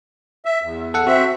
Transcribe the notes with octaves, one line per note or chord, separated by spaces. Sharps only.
E5
E2
A4 F#5
C4 F#4 E5